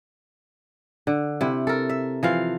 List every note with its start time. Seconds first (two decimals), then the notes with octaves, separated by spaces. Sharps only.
1.07 D3
1.41 C3 E4
1.67 A4 A#4
1.89 E5
2.23 E3 F3 F5